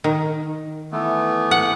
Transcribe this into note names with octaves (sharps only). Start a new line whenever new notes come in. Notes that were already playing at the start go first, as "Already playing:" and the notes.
D#3
E3 A3 B3
F#5